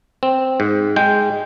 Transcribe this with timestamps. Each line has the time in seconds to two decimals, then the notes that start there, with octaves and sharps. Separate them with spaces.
0.23 C4
0.60 G#2
0.96 G#3 G5